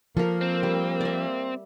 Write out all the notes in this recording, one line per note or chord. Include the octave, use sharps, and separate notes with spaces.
F3 A#3 A4 A#4
C4
G3
D5 E5